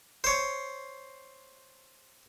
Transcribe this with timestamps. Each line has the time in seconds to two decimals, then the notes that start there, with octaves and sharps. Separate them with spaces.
0.24 C5 C#5